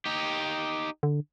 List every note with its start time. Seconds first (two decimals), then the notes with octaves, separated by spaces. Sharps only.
0.05 D#4 G4
1.03 D3